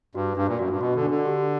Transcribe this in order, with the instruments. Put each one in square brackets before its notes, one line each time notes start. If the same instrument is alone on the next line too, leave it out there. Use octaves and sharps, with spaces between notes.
[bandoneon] G2 [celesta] F#4
[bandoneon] G2 [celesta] D4
[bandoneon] A#2
[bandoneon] F#2 [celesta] F#4
[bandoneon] G2
[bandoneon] B2 [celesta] F#4
[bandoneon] D3
[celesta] D4
[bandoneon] D3
[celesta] G4